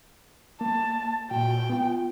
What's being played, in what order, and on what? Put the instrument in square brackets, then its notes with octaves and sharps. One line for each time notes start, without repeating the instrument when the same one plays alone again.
[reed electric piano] A#3 [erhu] A5
[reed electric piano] A#2 F#4 [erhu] G5
[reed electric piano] B3 F4